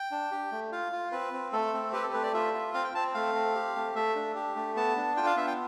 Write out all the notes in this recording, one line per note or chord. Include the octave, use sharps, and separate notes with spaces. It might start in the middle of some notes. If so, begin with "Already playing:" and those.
Already playing: G5
D4
G4
A3
F4 F5
F4
C4 B4
C4
A3 A4
C4
G4 B4
A4
A3 B4
D5
F4 E5
F4
C4 F5
G5
C4 A5
A3 F5
C4
G4
A3
A3 E5
D4
G4
A3
B3 A5
D4
F4 G5
F5
B3 E5
G5